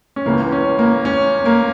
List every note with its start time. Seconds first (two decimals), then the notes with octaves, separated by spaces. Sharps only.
0.16 C#4
0.26 C#2 C#3 E3 A#3
0.52 C#4
0.79 A#3
1.05 C#4
1.46 A#3